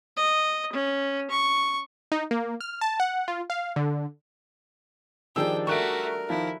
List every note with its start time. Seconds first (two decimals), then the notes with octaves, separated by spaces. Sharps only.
0.16 D#5
0.73 C#4
1.30 C#6
2.12 D#4
2.31 A#3
2.61 F6
2.81 A5
3.00 F#5
3.28 F4
3.50 F5
3.76 D3
5.36 D#3 F3 G3 D4 G#4 G5 E6
5.67 A3 F#4 A#4 E5 C#6 F#6 D7
6.29 D#3 F3 E4 F4